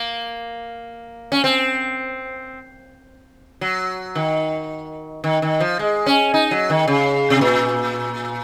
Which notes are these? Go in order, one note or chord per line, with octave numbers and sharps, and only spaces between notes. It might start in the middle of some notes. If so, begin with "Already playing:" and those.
Already playing: A#3
C#4
C4
F#3
D#3
D#3
D#3
F3
G#3
C#4
D#4
F#3
D#3
C#3
C3
A#2